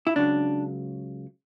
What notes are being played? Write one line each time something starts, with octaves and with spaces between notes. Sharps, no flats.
E4
C#2 C#3 F#3 D4